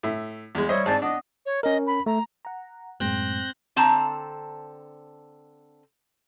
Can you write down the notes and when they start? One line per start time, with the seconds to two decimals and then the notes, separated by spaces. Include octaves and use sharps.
0.03 A2 E5
0.55 E2 G#3
0.69 G3 C5 C#5 D#5 E5
0.86 G#2 C4 D5 G#5 A5
1.02 B3 D4 D#5
1.46 C#5
1.63 C#4 A#4 D#5
1.87 B5
2.06 A3 A#5
2.45 F#5 A#5
3.00 F#2 A2 G#3 C4 F#6 G6 A#6
3.76 D3 C4 A5 A#5